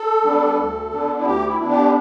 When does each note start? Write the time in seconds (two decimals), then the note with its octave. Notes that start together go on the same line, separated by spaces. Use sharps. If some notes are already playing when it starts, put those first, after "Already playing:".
Already playing: A4
0.24 G3 B3 D4
0.58 D2
0.91 D3 B3 D4
1.21 E4
1.25 D2 G4
1.47 E4
1.59 D3 B3 D4
1.71 G4